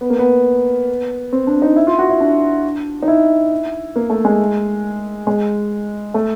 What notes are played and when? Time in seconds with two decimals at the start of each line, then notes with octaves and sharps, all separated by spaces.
0.01 B3
0.10 A#3
0.19 B3
1.33 C4
1.47 D4
1.62 D#4
1.76 E4
1.87 F4
1.99 F#4
2.09 E4
2.20 D4
3.03 D#4
3.08 E4
3.96 A#3
4.10 A3
4.25 G#3
5.27 G#3
6.14 A3